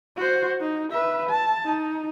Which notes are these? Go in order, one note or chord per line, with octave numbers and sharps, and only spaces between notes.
F#4 C5
D#4
B4 E5
A5
D#4